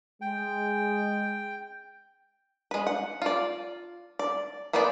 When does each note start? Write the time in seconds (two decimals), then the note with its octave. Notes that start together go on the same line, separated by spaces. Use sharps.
0.22 G#3 G5
2.71 G#3 B4
2.87 F#5
3.22 F4 D5
4.19 D5
4.73 A#3 B3 B4 C5 D5